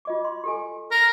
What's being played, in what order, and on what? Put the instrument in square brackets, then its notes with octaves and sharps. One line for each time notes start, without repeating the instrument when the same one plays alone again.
[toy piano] F4 D#5 D6
C6
G4 A4 G#5
[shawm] A#4